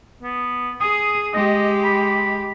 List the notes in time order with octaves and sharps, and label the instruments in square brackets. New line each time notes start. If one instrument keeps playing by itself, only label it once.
[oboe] B3
[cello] G#4 [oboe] D#6
[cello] G#3 G4 [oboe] D#5
[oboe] B5